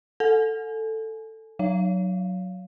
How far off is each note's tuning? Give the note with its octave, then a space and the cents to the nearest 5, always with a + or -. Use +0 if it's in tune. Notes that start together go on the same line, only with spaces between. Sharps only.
A4 +10 G#5 +25
F#3 +0 C#5 +30 F5 +0